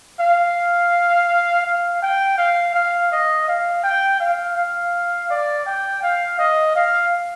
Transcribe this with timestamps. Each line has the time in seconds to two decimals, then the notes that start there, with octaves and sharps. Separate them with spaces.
0.20 F5
1.66 F5
2.02 G5
2.38 F5
2.74 F5
3.12 D#5
3.48 F5
3.84 G5
4.20 F5
4.56 F5
5.30 D5
5.66 G5
6.03 F5
6.39 D#5
6.75 F5